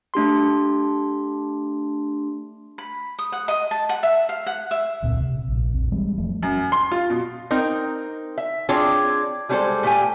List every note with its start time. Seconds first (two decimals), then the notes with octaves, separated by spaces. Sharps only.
0.14 A3 D4 G4 C6
2.78 B5
3.19 D#6
3.32 F#5
3.48 D#5
3.71 A5
3.89 F#5
4.03 E5
4.29 F5
4.46 F#5
4.71 E5
5.02 E1 C#2 A#2 C4
5.20 C3
5.48 A#1 A#2
5.73 E1 A#1 C4
5.92 E3 G3 G#3 C4
6.17 F1 F3 G3 A3
6.43 F#2
6.72 C6
6.92 F4
7.10 B2
7.51 C4 D#4 A#4
8.38 E5
8.69 C4 D4 F4 G#4 C#5 D5
9.49 G3 G#3 D4 G#4 A4 C5
9.83 A#2 A3 G4 G#5